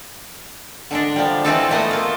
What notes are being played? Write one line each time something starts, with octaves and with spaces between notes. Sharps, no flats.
D3 G#3 D4
F3 G3
E3 G#3 A3 C4 F4 A4
A3 B3 C5 D#5
A#3 F4